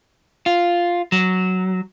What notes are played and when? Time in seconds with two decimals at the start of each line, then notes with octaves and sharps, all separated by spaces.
0.46 F4
1.12 F#3